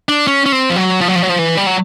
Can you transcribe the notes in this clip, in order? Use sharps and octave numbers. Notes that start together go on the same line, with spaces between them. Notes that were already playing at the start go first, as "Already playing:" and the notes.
D4
C#4
C#4
C4
F3
F#3
F3
F#3
F3
F#3
F3
E3
G3
F#3